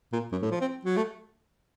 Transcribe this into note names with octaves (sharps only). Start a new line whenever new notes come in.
A#2
F#2
A2
F3
C4
F#3
A3